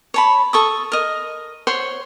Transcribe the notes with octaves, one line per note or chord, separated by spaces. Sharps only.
C#5 A5 B5
A4 C#6 D#6
A#4 D#5
C5 C#5 F#5 C6